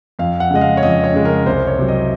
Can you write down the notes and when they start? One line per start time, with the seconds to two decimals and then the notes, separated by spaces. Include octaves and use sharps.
0.19 F2 F5
0.40 F#5
0.51 C#3 G#3 D#5
0.61 F5
0.77 C#5
0.83 F2 D#5
1.04 C#5
1.14 C#3 G#3
1.25 A#4
1.46 C2 C5
1.67 C#5
1.78 C3 F#3
1.88 D#5